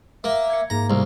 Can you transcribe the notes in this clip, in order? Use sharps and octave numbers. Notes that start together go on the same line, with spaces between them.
A#3 E5
G#6 C#7
G#2 A#3 A#5
C2 F5